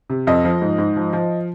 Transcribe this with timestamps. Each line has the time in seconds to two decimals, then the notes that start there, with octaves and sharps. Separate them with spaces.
0.10 C3
0.27 F2 D#5
0.44 F3
0.62 G#2
0.78 G#2
0.96 F3
1.13 F3